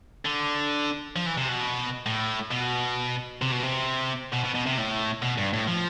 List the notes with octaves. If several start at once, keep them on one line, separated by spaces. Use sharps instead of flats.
D3
F3
E3
C3
B2
A2
B2
C3
B2
C3
B2
B2
B2
C3
A2
B2
G2
A2
F3